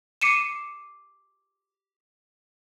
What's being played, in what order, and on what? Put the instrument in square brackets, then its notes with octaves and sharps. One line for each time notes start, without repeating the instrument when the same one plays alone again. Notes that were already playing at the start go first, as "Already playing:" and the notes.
[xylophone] D6 C7 C#7 D#7 E7